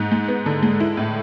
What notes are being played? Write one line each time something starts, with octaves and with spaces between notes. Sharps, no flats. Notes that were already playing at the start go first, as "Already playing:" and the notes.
Already playing: G#2
G#3
B3
D3
G#3
E4
A2